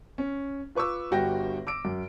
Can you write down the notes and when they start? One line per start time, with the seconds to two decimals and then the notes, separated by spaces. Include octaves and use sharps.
0.18 C#4
0.75 F4 B4 C#6 D6 E6
1.11 G1 G2 F#4 G4 G5 A#6
1.67 D6 E6 D7
1.85 F#2